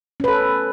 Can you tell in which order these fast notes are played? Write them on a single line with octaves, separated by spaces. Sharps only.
C#4 B4 A4